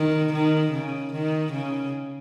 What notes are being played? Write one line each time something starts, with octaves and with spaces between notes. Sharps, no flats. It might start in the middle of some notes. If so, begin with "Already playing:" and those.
Already playing: D#3
D#3
C#3
D#3
C#3